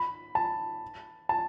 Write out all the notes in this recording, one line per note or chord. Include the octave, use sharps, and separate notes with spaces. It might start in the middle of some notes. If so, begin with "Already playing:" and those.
Already playing: B5
A5
A5